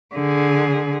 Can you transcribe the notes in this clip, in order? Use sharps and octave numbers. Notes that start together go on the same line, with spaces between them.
D3 G#4